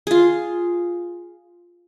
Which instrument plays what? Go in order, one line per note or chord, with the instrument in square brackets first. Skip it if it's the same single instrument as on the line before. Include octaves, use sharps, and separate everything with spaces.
[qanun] F4 G#4